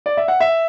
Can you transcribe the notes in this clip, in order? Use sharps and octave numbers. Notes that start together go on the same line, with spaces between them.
D5
E5
F#5
E5